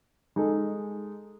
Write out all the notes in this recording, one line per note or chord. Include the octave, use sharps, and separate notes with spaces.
G#3 D#4 A4